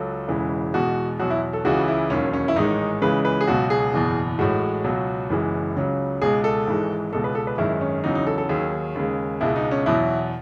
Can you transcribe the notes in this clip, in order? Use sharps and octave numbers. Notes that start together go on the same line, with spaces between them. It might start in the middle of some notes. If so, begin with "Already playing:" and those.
Already playing: C#2 F#3 A4
E1 E2 C#3 E3 G#3
E2 B2 G#3 F#4
E2 B2 F#3 F#4
E4
A4
C#2 C#3 E3 G#3 F#4
E4
E1 D#2 D#3 F#3 C#4
C#4
E4
A1 G#2 D#3 G#3 D#4
C#2 C#3 E3 G#3 B4
B4
G#4
C#2 B2 F#3 F#4
G#4
F#1 E2 B2
A1 A2 G#3 F#4
C#2 B2 F#3
F#1 F#2 E3 G#3
C#2 C#3 F#3
C#2 B2 G#3 G#4
A4
G#1 G#2 E3 G#3
C#2 B2 G#3 A4
B4
A4
B4
G#1 F#2 D#3 G#3 E4
C#4
E2 C#3 F#3 D#4
D#4
A4
A4
D#2 D#3 F#3 G#4
D#2 C#3 G#3
C#2 B2 G#3 E4
D#4
C#4
E2 B2 F#3 E4